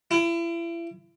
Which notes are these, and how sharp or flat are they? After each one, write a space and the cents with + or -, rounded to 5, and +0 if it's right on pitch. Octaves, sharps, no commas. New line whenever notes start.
E4 +35